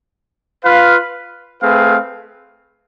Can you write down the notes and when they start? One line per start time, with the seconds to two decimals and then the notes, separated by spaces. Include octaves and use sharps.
0.64 F4 B4 F5
1.62 A3 C4 G#4 B4 F5